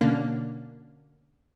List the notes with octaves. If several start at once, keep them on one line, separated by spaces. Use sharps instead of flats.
B2 D3 A#3 C#4 D4